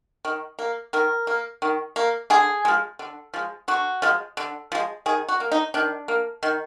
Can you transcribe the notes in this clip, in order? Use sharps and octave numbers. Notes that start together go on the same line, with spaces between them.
D#3
A#3
D#3 A#4
A#3
D#3
A#3
D3 G#4
F3 G#3
D3
F3 G#3
D3 F#4
F3 G#3
D3
F3 G#3
D#3 G#4
F#4
A#3
D#4
D#3 D4
A#3
D#3